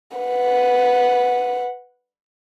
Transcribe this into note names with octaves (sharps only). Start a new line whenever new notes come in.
B4 F#5